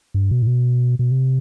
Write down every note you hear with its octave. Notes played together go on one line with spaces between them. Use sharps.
G2
B2
A2
B2
B2
C3